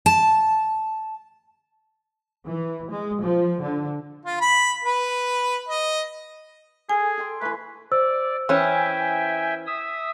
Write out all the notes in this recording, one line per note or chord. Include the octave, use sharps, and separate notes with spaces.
A5
E3
G#3
F3
D3
F4
B5
B4
D#5
G#4 A4 G#5
A4 G5 C6
E3 A3 B4
C5 D5 E6
E3 C#4 E5 G5 G#5
E5 D#6 E6